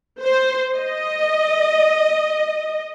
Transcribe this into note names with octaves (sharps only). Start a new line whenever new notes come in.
C5
D#5